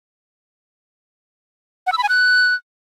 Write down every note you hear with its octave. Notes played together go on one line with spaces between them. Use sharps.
F#5
E6
B5
G#5
F#6